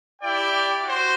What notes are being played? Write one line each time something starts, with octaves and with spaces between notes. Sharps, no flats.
E4 G4 D5 G5
F#4 C5